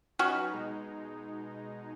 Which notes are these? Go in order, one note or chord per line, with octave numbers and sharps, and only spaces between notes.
F#3 C#4 D#4 F#4 B4
B2 G#3 D#4